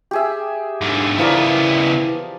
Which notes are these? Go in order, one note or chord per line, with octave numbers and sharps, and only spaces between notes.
G4 G#4 E5
G#2 D3
C#3 E3 F3 B3 A#4 D5